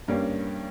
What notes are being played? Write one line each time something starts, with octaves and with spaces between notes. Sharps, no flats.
G2 G3 A#3 C#4